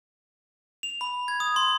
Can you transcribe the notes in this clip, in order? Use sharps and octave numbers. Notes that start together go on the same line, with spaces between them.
F7
B5
G#6
D#6
C6